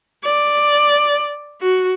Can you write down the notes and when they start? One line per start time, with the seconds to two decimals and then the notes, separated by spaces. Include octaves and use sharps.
0.25 D5
1.61 F#4